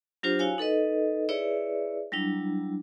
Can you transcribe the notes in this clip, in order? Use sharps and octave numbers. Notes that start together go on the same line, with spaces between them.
F#3 D4 F4 G4 C5
E4 F#4 C#5 F5 G#5
D#4 A4 B4 D#5
E4 G#4 B4 C#5 D5 E5
F#3 G3 D4 E4